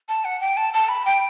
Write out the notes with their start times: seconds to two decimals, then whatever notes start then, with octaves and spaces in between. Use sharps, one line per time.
0.09 A5
0.25 F#5
0.41 G5
0.57 A5
0.73 A5
0.89 B5
1.06 G5